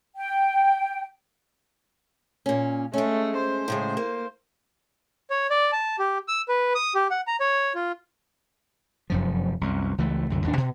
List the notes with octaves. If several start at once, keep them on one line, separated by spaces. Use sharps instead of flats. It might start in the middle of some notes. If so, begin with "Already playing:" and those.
G5
A#2 C#4
G#3 A3 C#4
C5
A2 C#3 G#3
A#3
C#5
D5
A5
G4
E6
B4
D#6
G4
F#5
A#5
C#5
F4
F1 F#2 F3
C2 F#2
C#2 E3 A3
C2 F#2 D3
D#2 A2 D4
B2